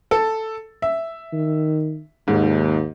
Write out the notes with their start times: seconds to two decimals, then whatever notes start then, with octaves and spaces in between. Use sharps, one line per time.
0.11 A4
0.82 E5
1.33 D#3
2.28 D#2 G#2